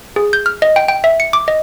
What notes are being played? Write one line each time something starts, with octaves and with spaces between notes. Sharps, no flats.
G#4
G6
F6
D#5
G5
G5
E5
C#7
D6
D#5